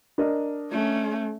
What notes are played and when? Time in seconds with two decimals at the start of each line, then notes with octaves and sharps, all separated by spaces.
0.18 D4 A#4 D#5
0.72 A3 C#4